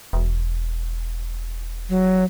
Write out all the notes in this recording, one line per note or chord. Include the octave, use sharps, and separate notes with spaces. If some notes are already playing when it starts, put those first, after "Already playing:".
E1
F#3